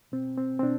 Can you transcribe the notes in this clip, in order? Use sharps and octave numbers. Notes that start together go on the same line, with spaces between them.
B2 C4
C4
C4
B2 D4